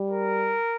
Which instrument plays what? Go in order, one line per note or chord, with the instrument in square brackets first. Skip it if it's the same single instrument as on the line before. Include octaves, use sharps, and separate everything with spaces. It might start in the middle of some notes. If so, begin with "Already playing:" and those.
Already playing: [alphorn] G3
[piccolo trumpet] A#4